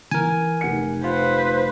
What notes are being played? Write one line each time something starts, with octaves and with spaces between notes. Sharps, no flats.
E3 A#4 G#5
F1 F#5 C#7
F4 B4 C5